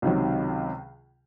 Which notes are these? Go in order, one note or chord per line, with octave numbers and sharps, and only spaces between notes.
C#2 C3 D#3 F#3